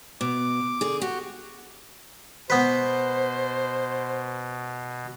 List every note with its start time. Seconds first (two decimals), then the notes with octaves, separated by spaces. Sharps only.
0.21 B2 D6
0.81 D3 G#4
1.02 F#4 G4
2.50 B2 B3 B4 C5